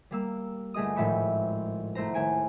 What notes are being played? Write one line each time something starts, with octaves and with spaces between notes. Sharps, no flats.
G3 A#3 E6
G1 A3 G#4 D#5 D#6
G#1 A2 F3 E5 B5 C#6
F1 A3 E4 C5 A#5
D#2 A3 G#5 D7